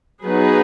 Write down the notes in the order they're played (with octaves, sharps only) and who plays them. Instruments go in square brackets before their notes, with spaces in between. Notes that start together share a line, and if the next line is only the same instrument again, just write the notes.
[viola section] F#3 B3 D#4 G#4 B4